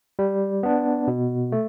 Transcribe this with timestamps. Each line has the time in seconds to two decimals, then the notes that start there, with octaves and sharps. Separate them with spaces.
0.19 G3
0.63 B3 D4
1.08 B2
1.52 A3